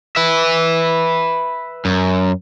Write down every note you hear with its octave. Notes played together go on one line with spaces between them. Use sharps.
B4 E5
F#2